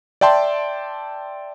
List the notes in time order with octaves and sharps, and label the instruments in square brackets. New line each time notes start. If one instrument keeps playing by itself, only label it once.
[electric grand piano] D5 E5 G5 A5 C6